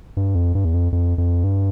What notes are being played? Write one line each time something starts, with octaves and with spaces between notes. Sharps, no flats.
G2
F2
G2
E2
F2
F2
F2
G2